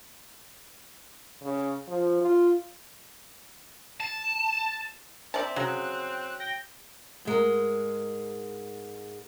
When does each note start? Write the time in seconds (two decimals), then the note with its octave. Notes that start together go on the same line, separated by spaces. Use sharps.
1.42 C#3
1.88 F3
2.22 F4
4.00 A5
5.34 C4 D5 E5 A5
5.56 C#3 F#3 F#6
6.40 G5 A#6
7.25 G#2 G#3 A#4